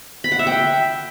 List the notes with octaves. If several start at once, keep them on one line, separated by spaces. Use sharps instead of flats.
B5
F#5
E5
G5